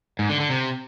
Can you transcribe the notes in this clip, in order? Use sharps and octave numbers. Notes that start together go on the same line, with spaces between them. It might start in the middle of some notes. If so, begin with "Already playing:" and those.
G#2
D3
D3
C3